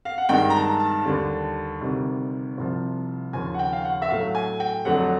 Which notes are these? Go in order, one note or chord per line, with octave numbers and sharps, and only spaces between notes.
F5
F#5
G2 D#3 G#3 G5
A#5
A5
A5
D#2 D3 G3
D2 C3 D#3 G3
C2 C3 F3
D#2 C#3 F3 G#5
F#5
G5
F5
F#5
E5
A2 F#3 A3 F5
G#5
G5
F2 D3 F#3 A3 F#5